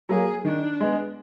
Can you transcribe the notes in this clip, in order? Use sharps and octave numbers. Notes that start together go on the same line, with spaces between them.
F#3 A#3 G#4
D#3 D4
G#3 B3